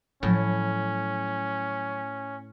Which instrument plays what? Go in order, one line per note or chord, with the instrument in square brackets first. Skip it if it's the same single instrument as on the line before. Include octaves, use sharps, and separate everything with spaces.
[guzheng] A2 [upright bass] F3 F#3 [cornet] C#4